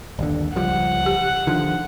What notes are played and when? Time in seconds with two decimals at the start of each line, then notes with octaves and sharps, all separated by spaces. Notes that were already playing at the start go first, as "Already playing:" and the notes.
0.19 G1 D#2 D3
0.56 C#2 F3 G3 F#5
1.06 G4
1.47 D3 D#3 F3